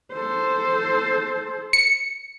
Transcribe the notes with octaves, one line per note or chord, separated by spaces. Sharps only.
A4 C5
C#7